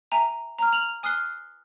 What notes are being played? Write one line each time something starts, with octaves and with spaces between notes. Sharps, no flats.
E5 G#5 A#5
A#5 F6
F7 F#7
G#5 D#6 F6 F#6 C7 G7